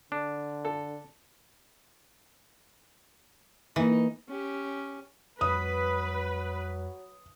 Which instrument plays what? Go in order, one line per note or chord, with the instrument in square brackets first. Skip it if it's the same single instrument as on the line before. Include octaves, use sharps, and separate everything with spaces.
[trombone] D3 [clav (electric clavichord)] D4
[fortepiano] A4
[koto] E3 [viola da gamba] A#3 D#4
[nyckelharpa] C#4 G4
[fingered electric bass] F2 G3 [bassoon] F#3 [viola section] B4 [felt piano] D#6